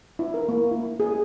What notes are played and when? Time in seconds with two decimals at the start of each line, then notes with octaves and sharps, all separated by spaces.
0.19 E4
0.34 A#4
0.49 A#3
0.71 E4
1.00 G#4